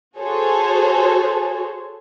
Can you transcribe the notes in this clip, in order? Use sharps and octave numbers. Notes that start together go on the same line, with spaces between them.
F#4 G#4 A4 C5 C#5